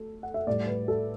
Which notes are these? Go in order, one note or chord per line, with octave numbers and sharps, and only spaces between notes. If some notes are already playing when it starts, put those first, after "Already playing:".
Already playing: A3 A4
F#5
E5
A2 G3 D5
B4
A4